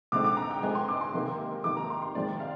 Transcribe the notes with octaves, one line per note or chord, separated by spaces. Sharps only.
D3 G#3 C4 D#4 D6
D6
A#5
G5
D3 G#3 C4 D#4 G#5
C6
D6
C6
C3 D#3 A#3 D#4
C3 D#3 A#3 D#4 D6
A#5
C6
C6
D#3 G#3 C4 D5
F5